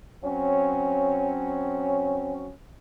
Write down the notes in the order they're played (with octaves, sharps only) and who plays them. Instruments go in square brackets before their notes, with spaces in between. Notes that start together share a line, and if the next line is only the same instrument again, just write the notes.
[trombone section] F#3 C4 C#4